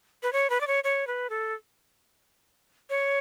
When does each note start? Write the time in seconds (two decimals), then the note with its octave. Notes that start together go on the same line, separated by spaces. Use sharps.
0.23 B4
0.33 C#5
0.50 B4
0.61 D5
0.67 C#5
0.84 C#5
1.07 B4
1.30 A4
2.90 C#5